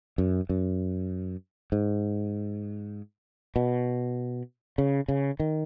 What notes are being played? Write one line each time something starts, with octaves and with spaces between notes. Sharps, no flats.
F#2
F#2
G#2
B2
C#3
C#3
D#3